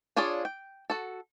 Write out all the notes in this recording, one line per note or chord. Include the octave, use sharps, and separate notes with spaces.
D4 F4 G#4 C#5 D5
G5
F#4 A4